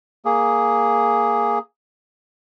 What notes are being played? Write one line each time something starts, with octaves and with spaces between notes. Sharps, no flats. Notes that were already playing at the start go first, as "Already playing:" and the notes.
A#3 G#4